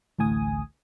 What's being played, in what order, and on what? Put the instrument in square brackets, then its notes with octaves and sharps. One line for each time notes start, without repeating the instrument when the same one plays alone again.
[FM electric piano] A1 D2 A2 G#5 D#6